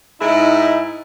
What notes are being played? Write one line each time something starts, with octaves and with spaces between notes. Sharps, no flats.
G#2 D#4 E4